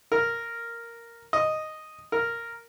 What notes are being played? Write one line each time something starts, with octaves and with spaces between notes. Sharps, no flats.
A#4
D#5
A#4